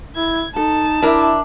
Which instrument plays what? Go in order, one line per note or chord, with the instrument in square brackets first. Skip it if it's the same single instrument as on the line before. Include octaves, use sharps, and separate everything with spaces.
[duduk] E4 [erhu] G#6
[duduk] D#4 [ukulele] A4 [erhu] A5
[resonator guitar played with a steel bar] D4 [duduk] E4 [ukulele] A#4 E5